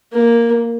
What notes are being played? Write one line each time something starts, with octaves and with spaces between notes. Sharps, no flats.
A#3